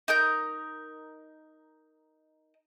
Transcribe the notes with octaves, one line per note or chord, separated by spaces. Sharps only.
D#4 A#4 G6